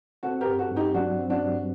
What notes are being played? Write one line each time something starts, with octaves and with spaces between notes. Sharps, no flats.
C4 F#4 A4
G4 A#4
G2
F#4 A4
G2
D#4 G4
F#3 D4 F#4
C4
D4 F#4
G2